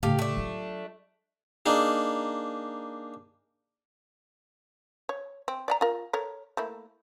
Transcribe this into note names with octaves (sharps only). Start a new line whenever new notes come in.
A2 C#3 G4 A4 F5
A3 D4
F#3 F4
A#3 D4 D#4 G#4
C#5
C4
D5 F#5 A#5
F4 A#4
A4 A#4 C#5
A3 A#3 E4